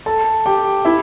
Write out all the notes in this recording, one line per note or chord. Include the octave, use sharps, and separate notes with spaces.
A4 A5
G4 G5
E4 E5